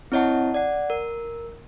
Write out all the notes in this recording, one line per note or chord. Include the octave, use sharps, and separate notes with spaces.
C4 E4 C#5 D#5 F#5 A5
D5 F#5
A#4